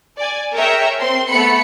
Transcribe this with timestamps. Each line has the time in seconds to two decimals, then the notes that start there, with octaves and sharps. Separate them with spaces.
0.17 D5 G#5
0.53 G#4 A#4 C#5 E5 G5 A#5
0.99 C4 C6
1.28 A3 B3 B5 C#7